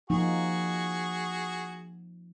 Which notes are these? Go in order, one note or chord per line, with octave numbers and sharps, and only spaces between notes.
F3 A#3 D#4 F#4 G#4